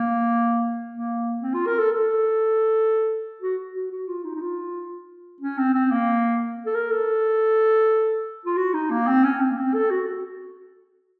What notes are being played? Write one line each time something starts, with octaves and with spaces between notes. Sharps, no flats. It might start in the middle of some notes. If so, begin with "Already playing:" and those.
Already playing: A#3
A#3
C4
F4
A#4
A4
A4
F#4
F#4
F#4
F4
D#4
D#4
F4
C#4
C4
C4
A#3
A4
A#4
A4
F4
F#4
D#4
A#3
C4
C#4
C4
A#3
C4
A4
F#4
F#4